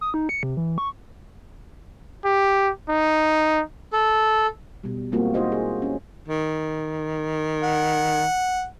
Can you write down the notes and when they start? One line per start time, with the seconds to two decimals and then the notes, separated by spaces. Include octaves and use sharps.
0.01 D#6
0.14 D#4
0.29 C#7
0.43 C3
0.57 E3
0.78 C#6
2.25 G4
2.89 D#4
3.92 A4
4.84 B2 G3
5.12 G3 G#3 A#3 C4 F4 F#4
5.34 D#4 E4 F#4 C5 D#5
5.52 G#4
5.82 C#4
6.28 D#3
7.63 F#5